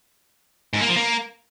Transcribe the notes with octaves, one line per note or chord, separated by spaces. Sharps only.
G#2
A#3
F3
A#3